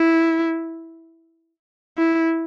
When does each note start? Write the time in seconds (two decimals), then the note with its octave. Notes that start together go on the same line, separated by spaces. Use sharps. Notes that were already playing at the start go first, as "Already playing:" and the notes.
Already playing: E4
1.98 E4